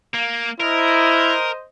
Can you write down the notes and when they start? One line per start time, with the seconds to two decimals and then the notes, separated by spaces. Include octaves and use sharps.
0.14 A#3
0.60 E4 A#4 C5 D#5